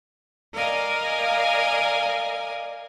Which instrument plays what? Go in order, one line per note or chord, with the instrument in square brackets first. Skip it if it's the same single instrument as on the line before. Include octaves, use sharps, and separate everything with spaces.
[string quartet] A#4 D5 D#5 F5 G#5